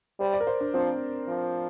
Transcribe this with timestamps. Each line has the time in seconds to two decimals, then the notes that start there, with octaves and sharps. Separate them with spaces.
0.20 G3 C5
0.33 D5
0.40 A#4
0.47 C5
0.61 D4
0.74 F3 C4
1.28 F3